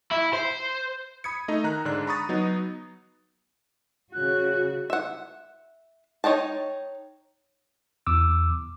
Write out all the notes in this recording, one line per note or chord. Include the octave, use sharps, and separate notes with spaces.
E4
C5
B5 D#6 G#6 C#7
A3 D#4 D#5
D#3 A#5 F#6
G#2 D3 D4 F#6
A#5 B5 C#6 D#6 A6
F#3 B3 D#4
C#3 F#4 F#6
E5 F#5
D#4 C#5 D#5 G5 A5
E2 D6 E6